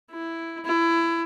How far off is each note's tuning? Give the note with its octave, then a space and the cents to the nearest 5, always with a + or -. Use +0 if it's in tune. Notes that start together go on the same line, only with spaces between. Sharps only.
E4 +5
E4 +20